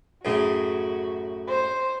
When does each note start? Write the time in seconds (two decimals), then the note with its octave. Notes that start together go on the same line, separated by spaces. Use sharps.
0.25 F#2 A2 C#3 F#4
1.48 C5